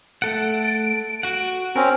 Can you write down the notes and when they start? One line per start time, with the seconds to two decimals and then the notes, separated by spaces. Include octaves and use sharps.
0.22 A3 A4 F#5 D7
1.23 F#4 F#5
1.76 C4 C#4 A#4